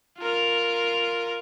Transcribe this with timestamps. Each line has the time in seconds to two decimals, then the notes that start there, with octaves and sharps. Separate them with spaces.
0.19 F4 A#4